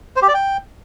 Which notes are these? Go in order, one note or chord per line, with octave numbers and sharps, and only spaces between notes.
C5
G4
D5
G5